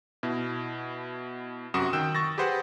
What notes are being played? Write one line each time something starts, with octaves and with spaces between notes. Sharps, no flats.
B2 E4
F#2 C3 F#4 D#6 E7
D#3 G5 E6 F#6 E7
C#6 A6 A#6
G4 G#4 B4 C5 F#5